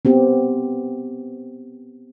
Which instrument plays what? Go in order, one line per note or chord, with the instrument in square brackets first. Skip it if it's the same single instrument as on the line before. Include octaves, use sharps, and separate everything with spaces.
[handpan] B3 C4 G4